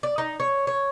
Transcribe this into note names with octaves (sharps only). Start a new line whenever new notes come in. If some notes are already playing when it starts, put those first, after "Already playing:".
D5
D#4
C#5
C#5